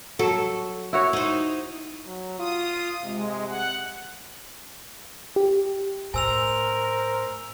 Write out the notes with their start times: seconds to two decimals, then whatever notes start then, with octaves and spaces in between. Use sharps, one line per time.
0.19 F#3 A4
0.93 E4 F#4 C#5
1.13 D#4 C5
2.06 F#3
2.39 F4 D#6
3.04 C3 G#3
3.49 F#5
5.36 G4
6.14 A2 A#4 C5 G#5 E6 F7